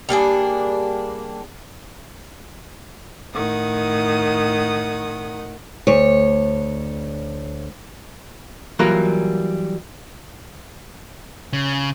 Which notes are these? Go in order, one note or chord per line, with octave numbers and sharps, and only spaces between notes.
G3 A#3 D4 G#4
A2 D#3 F#5 D#6
D2 C#5
E3 F#3 G3 A#3 F4 A#4
C#3